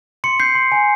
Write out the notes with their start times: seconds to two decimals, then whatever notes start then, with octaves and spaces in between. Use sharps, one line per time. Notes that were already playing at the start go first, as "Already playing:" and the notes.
0.24 C6 C#7
0.40 G6 C7
0.55 C6
0.72 G#5